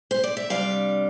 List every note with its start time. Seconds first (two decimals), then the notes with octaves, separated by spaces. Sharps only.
0.11 C5
0.24 D5
0.37 E5
0.50 C3 G3 D4 D5 F5